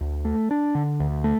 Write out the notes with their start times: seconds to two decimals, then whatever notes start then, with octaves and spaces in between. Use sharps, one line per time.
0.01 D2
0.25 A3
0.51 D4
0.75 D3
1.00 D2
1.24 A3